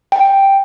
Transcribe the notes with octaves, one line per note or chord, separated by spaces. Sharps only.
G5